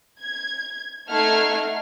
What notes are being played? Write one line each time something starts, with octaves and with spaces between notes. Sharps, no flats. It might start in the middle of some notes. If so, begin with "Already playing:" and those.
G#6
A3 D#4 F#5 F6 G#6 C7